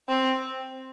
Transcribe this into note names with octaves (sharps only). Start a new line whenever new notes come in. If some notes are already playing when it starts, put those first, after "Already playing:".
C4